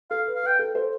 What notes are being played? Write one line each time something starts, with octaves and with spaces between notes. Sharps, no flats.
A4 F5
B4
F5
B4 G5
A4
A4 C5